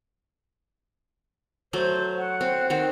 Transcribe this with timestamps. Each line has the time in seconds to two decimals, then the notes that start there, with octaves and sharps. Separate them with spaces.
1.73 F#3 A3 C5
2.18 F#5
2.41 C4
2.70 D#3 C4 F#5